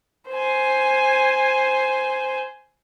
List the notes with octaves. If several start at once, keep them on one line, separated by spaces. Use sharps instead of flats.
C5 G#5